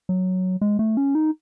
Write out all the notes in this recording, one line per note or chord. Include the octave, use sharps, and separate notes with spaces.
F#3
G#3
A3
C#4
D#4